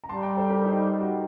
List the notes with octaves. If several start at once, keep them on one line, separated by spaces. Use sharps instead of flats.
A#5
G3 A5 C6
G5 A#5
A4 C5
G4 A#4
D#4 G4
F#4